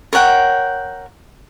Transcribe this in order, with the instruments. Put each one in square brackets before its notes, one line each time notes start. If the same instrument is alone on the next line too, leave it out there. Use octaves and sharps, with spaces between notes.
[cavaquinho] A#4 C#5 F#5 G5